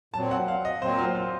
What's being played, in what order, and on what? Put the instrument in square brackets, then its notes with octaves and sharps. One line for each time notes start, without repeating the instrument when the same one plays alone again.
[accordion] A#2 F#3 C4 [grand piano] A5
[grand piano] F#5
F5
D#5
[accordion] A#2 F#3 C4 [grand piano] C5
[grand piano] F4
F4